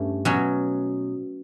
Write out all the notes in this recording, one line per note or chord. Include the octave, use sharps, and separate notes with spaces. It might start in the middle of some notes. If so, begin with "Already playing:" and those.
Already playing: G2 A3 C#4
B2 F#3 C#4